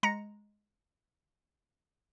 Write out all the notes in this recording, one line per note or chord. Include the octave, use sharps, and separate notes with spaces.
G#3 A#5 A#6 C#7